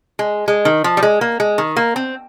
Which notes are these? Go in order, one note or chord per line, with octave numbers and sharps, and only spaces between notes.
G#3
G#3
D#3
F3
G3
G#3
A#3
G#3
D#3
A#3
C4